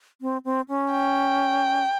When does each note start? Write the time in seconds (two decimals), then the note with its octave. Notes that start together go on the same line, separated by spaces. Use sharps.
0.21 C4
0.45 C4
0.68 C#4
0.92 G5